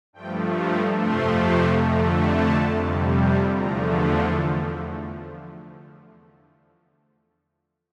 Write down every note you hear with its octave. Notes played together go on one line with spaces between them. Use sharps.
G2 F3 A3 G5
A#5
F2 C3 F3 A3 C6
F2 D3 A3 A#5
A5
F2 C3 G3
E2 D3 F3 A3 A#5